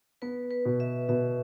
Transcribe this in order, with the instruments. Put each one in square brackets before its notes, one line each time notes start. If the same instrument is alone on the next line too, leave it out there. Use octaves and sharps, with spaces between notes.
[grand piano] B3 [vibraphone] B4
[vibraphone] B4
[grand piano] B2
[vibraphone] E5
[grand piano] B2 [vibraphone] E5